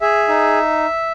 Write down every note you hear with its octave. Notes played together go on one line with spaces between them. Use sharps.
G#4 E5
D#4